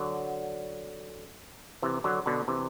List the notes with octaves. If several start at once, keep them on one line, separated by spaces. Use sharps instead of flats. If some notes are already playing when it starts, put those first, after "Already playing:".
Already playing: D3 F#3
C3 E3
D3 F#3
B2 D3
C3 E3